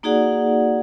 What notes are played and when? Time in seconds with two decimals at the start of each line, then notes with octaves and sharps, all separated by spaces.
0.03 A#3 D#4 F#4 G#4 D5 F#5